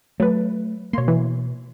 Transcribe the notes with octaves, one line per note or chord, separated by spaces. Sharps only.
F#3 A3 B4
B2 A#3 C#5 C6
E3